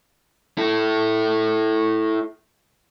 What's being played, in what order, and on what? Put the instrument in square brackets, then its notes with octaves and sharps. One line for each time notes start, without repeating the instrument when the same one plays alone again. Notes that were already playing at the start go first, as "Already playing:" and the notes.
[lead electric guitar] E4 A4